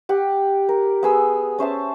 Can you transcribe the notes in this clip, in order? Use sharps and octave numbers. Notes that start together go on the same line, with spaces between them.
G4 F#5
A#4
B3 G#4 E6
C#4 C5 E5 A5